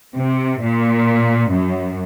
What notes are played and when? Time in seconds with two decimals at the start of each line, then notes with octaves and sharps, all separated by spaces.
0.16 C3
0.62 A#2
1.52 F#2